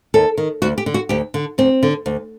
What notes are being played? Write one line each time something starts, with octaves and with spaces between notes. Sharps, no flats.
D#2 A4
D#3
D2 F#4
G4
D3
F#4
D2 G4
D3
D2 C4
D3
D2